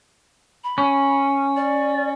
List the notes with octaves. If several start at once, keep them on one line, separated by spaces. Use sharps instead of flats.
B5
C#4
D5